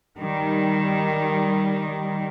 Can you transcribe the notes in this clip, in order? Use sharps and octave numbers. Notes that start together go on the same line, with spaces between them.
D#3 G3